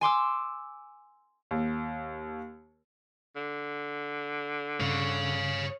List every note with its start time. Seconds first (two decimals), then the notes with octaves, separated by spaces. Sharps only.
0.01 G#5 C6 D6 E6
1.51 D#2
3.36 D3
4.80 G2 C#3 C#5 F5